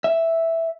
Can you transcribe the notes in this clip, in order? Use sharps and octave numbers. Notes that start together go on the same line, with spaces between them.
E5